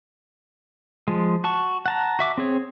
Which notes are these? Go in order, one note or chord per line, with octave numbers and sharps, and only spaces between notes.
F3 G#3
F#4 A5 C#6
F#5 A5 A#5
F#4 E5 D6
C4 G#4 C#5